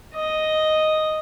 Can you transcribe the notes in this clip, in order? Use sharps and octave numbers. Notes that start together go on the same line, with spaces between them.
D#5